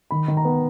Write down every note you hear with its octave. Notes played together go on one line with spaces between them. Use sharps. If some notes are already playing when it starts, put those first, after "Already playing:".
D#3 B5
D#3
A#5
B3